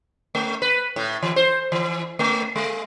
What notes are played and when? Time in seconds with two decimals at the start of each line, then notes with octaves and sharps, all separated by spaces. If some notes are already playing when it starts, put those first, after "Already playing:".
0.35 A3
0.62 B4
0.96 A2
1.22 E3
1.36 C5
1.72 E3
2.19 A3
2.56 G#3